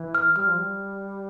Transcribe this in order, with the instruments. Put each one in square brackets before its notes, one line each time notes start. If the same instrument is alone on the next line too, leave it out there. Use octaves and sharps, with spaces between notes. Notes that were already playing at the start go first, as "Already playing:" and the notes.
Already playing: [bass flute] E3
[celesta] F6
[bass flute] G3 [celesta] F6
[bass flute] F3
G3